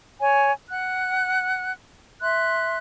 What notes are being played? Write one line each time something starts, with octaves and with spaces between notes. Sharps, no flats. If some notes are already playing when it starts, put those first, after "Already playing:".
C#5 G#5
F#5 F#6
E5 C6 F#6